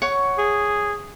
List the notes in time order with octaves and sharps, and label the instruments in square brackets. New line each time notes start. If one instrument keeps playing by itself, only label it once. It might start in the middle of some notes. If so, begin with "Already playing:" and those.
[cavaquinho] C#5 F#5 C#6
[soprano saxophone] G#4